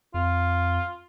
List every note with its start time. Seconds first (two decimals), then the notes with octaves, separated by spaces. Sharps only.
0.14 F2 F4